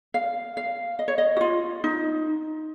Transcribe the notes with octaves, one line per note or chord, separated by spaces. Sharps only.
F5
F5
D#5
C#5
D#5
F#4
F4
D#4